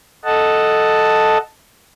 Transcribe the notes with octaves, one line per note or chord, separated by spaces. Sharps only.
A4 D#5 F#5 A5